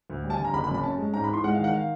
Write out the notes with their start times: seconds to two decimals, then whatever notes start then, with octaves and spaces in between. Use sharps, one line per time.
0.10 D2
0.24 G3
0.30 A5
0.34 G#5
0.39 D3
0.44 A#5
0.54 F#1 B5
0.64 B5
0.69 F#2
0.74 B5
0.83 C#4 A5
0.99 G#3
1.14 G#2 A#5
1.24 B5
1.29 E3 C6
1.44 G#3 F#5
1.54 F5
1.59 D#3
1.64 F#5
1.74 F5